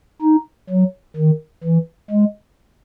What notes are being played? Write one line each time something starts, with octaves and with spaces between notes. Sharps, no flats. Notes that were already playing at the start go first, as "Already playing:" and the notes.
D#4
F#3
D#3
E3
G#3